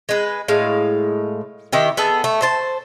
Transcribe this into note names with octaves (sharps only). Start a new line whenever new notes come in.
G#3 B4
A2 G#3 F5
D#3 E4 G4
B3 G#4 A4
A3
C5 A5